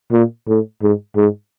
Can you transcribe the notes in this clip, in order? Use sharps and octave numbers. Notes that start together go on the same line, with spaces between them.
A#2
A2
G#2
G#2